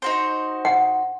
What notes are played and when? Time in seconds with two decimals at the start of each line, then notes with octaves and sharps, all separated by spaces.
0.02 D#4 F#4 C5
0.65 F#5